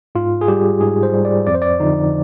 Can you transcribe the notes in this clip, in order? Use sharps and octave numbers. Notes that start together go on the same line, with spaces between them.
G#2 F4
G#4
G3 G4
G#2 G#4
C5
G3
D5
F2 D5
C5
D5
D3 F3 D#4